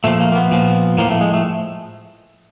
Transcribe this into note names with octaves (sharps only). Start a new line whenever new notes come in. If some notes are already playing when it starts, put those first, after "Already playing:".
A#2 F3 A3
A#3
A#3
B3
A#2 F3
A2 F3 A#3
A3
G#3
A3